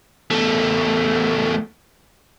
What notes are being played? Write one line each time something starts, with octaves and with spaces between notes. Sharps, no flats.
E2 A3